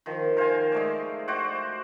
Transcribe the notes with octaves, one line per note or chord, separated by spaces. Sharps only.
D#3 F3
A#4 C5 F5 G#5
G#3 A3 D5
F#4 C5 D5 F#5